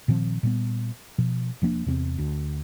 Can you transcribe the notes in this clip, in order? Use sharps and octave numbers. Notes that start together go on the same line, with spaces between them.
A#2 D#3 F3 C4
A#2 G3 B3
B2 F3
E1 F3 A#3 D4
E2 C3 A#3 C4
D2